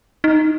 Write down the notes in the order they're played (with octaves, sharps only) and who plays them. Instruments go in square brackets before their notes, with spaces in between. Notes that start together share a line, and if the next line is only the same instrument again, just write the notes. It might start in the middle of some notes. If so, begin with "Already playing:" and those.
[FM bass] D#4